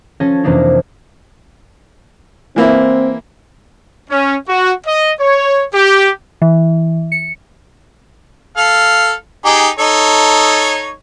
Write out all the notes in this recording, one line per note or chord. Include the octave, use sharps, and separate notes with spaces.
F3 C#4 A4 G#5 A#6
F2 C3 E3 A#3 D4 D#4
E3 A#3 C4 E4
C#4
F#4
D#5
C#5
G4
E3
C#7
A4 F5
D#4 G4 G#4
D#4 A4 C#5